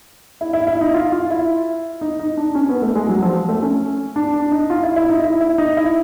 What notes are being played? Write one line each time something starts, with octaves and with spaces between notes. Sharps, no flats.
E4
E4
E4
D#4
F4
F4
E4
D#4
D#4
D4
C#4
B3
A3
G#3
F#3
F3
A3
C#4
D4
D4
D#4
F4
E4
E4
D#4
E4
E4
D#4
E4